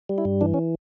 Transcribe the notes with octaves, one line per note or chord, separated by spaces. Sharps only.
G3
E4
G2
E3 D4
C#4